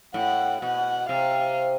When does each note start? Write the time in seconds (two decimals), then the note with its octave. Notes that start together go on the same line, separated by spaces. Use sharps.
0.14 A2 F#5
0.61 B2 F#5
1.09 C3 F5